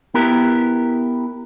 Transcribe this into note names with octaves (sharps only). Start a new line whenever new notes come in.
B3 E4 G4 A#4